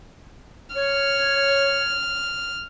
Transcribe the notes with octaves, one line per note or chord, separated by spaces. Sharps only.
C#5 F6